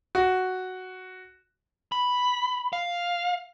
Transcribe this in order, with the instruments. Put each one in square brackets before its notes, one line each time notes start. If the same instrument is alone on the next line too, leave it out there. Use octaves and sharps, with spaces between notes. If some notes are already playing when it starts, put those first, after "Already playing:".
[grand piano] F#4
[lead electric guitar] B5
F5